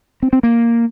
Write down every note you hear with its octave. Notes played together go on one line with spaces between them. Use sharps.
C4
C4
A#3